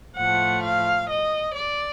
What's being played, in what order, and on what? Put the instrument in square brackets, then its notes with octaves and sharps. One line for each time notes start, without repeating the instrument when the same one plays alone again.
[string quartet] A2 F3 A3 F#5
F5
D#5
D5